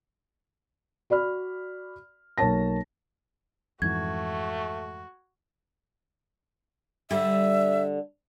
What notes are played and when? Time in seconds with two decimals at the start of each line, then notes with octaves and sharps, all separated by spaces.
1.10 F#4 D5 B5 F6
2.38 B1 A#3 C#5 A5 A#6
3.82 F2 G#2 E3 A3 F#4 G#6
7.11 D3 G3 E5